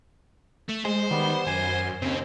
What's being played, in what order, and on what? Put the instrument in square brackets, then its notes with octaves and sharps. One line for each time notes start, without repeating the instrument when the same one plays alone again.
[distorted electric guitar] A3
[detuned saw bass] G#3 [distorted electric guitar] C5
[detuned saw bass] D#3 [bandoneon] G3 B3
[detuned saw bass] F#2 [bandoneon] G#5 C6
[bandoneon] D#2 [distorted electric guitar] C#3 [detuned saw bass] C4